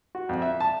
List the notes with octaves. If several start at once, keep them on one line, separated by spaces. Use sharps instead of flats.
F#4
F2
E5
A5